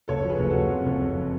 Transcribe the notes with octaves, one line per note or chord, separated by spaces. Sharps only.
F#1 A4 C#5
F3
G#4 B4
F#1
F#4 A4
F#1
F2 F4 G#4
F#1
F2